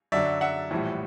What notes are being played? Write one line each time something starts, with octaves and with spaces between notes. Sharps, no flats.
F#2 D3 F#3 D5 E5
E5 F#5
A#1 A2 E3 G3